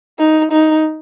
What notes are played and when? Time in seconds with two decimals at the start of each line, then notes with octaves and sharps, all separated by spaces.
0.19 D#4
0.52 D#4